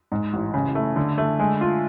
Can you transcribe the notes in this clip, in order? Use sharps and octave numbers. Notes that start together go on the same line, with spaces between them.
G#2
A1
C#3
A3
D3
A3
G#3
F4